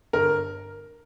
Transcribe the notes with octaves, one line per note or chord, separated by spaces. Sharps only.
G1 A#4